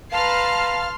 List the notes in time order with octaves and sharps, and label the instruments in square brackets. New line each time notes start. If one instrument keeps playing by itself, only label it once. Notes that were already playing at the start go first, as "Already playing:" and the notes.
[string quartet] B4 A#5 [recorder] F5 [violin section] A5 F6 [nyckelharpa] C6